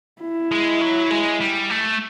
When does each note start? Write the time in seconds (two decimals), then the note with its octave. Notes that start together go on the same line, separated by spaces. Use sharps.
0.22 E4
0.52 G#3
0.81 F#3
1.11 G#3
1.41 G3
1.70 A3